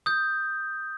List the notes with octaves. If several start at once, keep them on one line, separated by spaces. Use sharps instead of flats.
D#6 G6